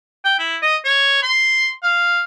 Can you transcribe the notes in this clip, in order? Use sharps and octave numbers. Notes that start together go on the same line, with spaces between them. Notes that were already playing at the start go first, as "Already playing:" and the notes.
G5
E4
D#5
C#5
C6
F5